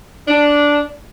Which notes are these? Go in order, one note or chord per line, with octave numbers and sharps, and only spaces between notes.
D4